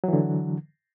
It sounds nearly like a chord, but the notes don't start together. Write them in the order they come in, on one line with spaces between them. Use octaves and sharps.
F#3 E3 D3